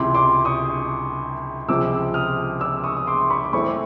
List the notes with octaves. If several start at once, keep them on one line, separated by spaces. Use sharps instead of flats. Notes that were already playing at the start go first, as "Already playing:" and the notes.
Already playing: C#2 C3 E3 C6 D6
C6 D6
C#6 D#6
C#2 C3 F3 G#3 C4 D6 E6
D#6 F6
D6 E6
C#6 D#6
D#6
C6 D6
B5 C#6
D6
A2 E3 A3 C4 B5 C#6